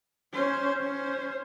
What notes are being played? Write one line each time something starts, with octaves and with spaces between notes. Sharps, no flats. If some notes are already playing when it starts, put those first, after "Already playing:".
C#4 C5
C#4 C5